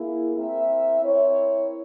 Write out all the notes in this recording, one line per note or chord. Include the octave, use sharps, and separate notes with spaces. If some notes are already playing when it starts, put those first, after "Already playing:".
Already playing: A#3 E4 G#4
C4 E4 A#4 E5
C4 E4 A#4 C#5